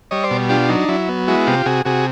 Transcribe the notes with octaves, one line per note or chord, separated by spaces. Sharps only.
G3 C#5 D#5
C5 D5
B2
D4 F4 G4
F#3 D#4
F#3 E4
B3
G#3 E4 F#4
C3 F4 G4
C3 F#4 G#4
C3 F#4 G#4